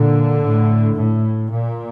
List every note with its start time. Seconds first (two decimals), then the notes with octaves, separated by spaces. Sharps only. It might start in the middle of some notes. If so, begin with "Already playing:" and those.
Already playing: A#2 D3
0.42 A2
0.96 A2
1.51 A#2